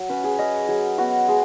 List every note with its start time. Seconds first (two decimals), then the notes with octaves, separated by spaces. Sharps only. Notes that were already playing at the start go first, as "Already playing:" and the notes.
Already playing: F#3
0.09 C#4 B4
0.24 G#4
0.39 C#4 D#5
0.68 F#3 G#4
0.98 B3 F#4
1.28 G#3 G#4